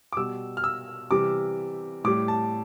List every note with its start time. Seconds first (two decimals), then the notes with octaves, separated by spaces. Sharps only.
0.13 D6
0.17 B2 G3 E6
0.57 F6
0.64 E6
1.11 C3 E3 G3 D6
2.04 A2 G3 D6
2.28 A5